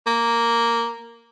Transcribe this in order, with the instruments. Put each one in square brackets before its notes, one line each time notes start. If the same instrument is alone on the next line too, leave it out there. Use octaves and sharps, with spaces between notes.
[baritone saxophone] A#3